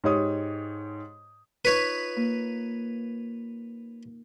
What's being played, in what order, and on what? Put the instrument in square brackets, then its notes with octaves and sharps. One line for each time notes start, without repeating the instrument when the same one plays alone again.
[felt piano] G#2 G4 C#5 D#6
[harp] D#4 F4 [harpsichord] B4 C#5
[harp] A#3